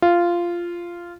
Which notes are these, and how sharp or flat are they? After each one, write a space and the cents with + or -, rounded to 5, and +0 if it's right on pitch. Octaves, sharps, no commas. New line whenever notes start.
F4 -10